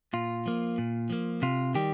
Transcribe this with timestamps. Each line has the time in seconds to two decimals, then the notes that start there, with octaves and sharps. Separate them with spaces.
0.13 A#2 F4
0.46 F3 A#3
0.78 A#2
1.10 F3 A#3
1.42 C3 F4
1.74 D#3 G3 G4